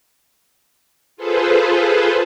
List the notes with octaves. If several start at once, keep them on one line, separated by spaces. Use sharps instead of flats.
F4 G#4 A4 B4 C5